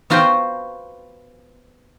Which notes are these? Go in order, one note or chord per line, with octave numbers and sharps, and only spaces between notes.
B3 F4 F#4 B4 C5 G5